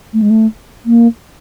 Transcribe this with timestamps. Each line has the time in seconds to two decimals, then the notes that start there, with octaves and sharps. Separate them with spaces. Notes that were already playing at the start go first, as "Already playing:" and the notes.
0.13 A3
0.22 G#3
0.30 A3
0.86 A#3